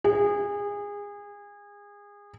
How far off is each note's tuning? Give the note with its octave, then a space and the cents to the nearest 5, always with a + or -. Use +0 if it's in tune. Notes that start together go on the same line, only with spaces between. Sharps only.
G#4 -25